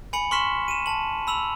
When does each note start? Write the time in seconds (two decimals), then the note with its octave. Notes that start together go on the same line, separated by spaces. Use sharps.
0.13 G#5 B5 C#7 F#7
0.31 C6 C#6 F6 B6 E7
0.68 D#7 E7
0.86 A5 F#7
1.27 B5 E6 F7 F#7